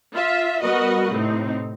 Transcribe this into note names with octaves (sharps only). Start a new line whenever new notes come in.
F4 E5
G3 B3 F#4 A#4 B4 D#5
A2 C3 C4 D#4